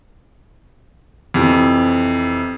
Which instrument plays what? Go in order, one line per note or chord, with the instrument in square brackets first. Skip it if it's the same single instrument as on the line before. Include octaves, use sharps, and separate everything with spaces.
[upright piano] F2 C3 E3